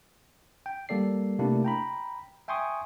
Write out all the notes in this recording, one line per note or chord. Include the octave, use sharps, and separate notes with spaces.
G5
G3 A#3 A4 D5 C7
C3 A3 A#3 D4 E4 G4
G5 A#5 B5
E5 G5 G#5 C6 C#6 D#6